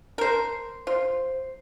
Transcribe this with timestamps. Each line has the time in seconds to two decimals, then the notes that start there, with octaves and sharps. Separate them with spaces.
0.18 A#4 C5
0.87 F4 C5